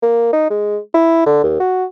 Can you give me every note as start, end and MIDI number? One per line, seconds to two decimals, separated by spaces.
0.02 0.31 58
0.33 0.49 63
0.50 0.78 56
0.94 1.23 64
1.26 1.43 50
1.43 1.57 39
1.60 1.85 66